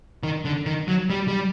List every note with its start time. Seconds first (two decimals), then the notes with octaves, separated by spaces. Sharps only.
0.23 D#3
0.45 D3
0.66 D#3
0.88 F#3
1.10 G3
1.28 G3